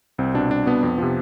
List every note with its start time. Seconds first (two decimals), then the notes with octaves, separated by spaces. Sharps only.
0.18 C2 C4
0.34 B2 D4
0.51 C2 D4
0.66 B2 B3
0.83 F2
0.98 C3 F3